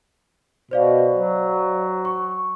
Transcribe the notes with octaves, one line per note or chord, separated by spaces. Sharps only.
B2 C5 D5 F5
F#3
C#6